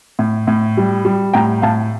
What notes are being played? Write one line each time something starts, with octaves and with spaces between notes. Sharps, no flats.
A2
A2
G3
G3
A2 G5 A#5
A2 F5 A5